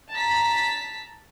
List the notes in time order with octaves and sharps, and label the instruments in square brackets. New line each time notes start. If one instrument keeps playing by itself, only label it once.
[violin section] A5 A#5 B6